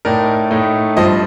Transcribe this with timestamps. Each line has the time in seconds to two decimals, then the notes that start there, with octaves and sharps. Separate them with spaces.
0.05 A2 A3 D#4 A#4 D5
0.51 A2 A3 D#4
0.96 G2 F3 C4 C5 D#5